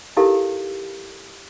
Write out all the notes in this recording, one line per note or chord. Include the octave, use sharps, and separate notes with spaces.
D#4 E4 G4 A4 A#4 F5